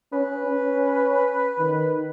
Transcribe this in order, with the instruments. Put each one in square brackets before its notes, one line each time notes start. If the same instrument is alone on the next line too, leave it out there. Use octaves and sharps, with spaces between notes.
[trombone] C#4 [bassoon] B4
[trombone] C#4
D#3